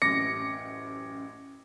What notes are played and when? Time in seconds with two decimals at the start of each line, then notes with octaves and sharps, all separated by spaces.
0.02 A1 F#2 D6 A#6 C#7